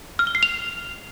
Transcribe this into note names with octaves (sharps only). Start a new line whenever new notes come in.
F6
G7
C7
F7